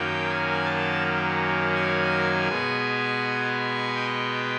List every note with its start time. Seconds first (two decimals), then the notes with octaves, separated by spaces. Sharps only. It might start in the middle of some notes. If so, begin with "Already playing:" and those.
Already playing: F#2 D#3 F#3 A#3 C#4 G5
0.29 G#5
0.65 A5
1.75 G#5
2.49 B2 G#3 B3
3.96 G5